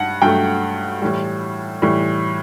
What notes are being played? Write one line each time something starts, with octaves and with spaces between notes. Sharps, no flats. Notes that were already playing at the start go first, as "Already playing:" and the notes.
Already playing: G2 F#5
G2 F#3 A3 G5
A2 E3 G3
A2 E3 G3